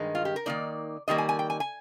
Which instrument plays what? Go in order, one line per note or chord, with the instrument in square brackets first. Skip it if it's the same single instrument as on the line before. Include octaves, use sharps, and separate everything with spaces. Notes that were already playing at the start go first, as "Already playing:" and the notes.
Already playing: [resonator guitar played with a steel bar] G2 D#3 G#3 D#4
F4
G4
A#4
D#3 A#3 D#4 D5
D#3 G3 A#3 D#5
G#5
G#5
G5
G#5
G#5